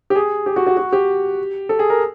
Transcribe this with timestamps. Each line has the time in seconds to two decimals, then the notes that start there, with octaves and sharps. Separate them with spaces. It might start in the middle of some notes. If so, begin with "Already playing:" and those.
0.10 G4
0.16 G#4
0.46 G4
0.56 F#4
0.67 F#4
0.77 F#4
0.93 G4
1.69 A4
1.79 G#4
1.90 A#4